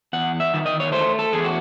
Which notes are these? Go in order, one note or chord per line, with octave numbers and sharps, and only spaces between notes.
E2 F#5
E5
D#3
D#5
C#5
A3 C5
A4
E2 G#4
F#4